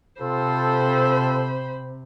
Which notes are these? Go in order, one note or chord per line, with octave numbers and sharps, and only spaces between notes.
C3 C4 F4 A4 C5 B5